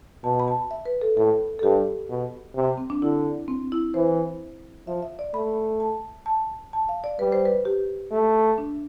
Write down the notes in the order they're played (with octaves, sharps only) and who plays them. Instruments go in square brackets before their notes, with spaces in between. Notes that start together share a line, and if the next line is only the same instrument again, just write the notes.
[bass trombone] B2 [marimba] A5
[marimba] B5
A5
E5
B4
A4
[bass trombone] A2 [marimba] A4
[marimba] A4
[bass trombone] G2 [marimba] G4
[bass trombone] B2
C3
[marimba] C4
D4
[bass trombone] D3 [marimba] E4
[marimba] C4
E4
[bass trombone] E3 [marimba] C5
[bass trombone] F3 [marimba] E5
[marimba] E5
D5
[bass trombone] A3 [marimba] B5
[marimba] A5
A5
A5
F5
D5
[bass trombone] G3 [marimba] B4
[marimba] C5
B4
G4
[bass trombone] A3
[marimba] D4